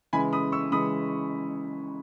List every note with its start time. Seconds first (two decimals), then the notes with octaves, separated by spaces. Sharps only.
0.13 C#3 E3 G#3 G#5 B5
0.33 B5 D#6
0.52 C#6 E6
0.72 C#3 E3 G#3 B5 D#6